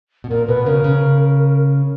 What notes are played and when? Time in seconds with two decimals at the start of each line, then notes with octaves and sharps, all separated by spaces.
0.24 B2
0.30 A#2 A#4
0.48 B2 B4
0.66 C#3 A#4
0.84 C#3